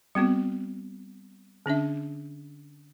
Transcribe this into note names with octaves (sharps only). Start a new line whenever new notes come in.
G3 B3 C4 F#4
D3 C#4 D4 E5